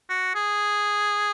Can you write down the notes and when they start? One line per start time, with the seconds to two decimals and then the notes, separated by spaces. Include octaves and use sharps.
0.09 F#4
0.35 G#4